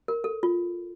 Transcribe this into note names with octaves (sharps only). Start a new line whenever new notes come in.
A#4
A4
F4